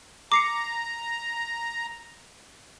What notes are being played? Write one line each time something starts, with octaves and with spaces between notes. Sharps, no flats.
A#5 D6 C7 C#7